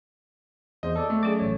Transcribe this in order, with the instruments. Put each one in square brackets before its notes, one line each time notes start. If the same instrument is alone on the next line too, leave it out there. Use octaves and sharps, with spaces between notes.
[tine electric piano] E2 C5 [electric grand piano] D#5
[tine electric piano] A4 D5
[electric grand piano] A3
[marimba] F#3 C#4 [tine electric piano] G#4 D5 D6
[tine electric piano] A1 C#5